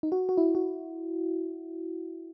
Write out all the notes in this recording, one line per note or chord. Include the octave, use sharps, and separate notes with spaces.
D#4
F#4
F#4
E4
F#4